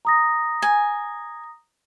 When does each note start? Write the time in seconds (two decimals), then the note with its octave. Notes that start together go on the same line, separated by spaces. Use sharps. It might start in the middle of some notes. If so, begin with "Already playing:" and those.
0.05 A#5 D#6 A#6
0.62 G#5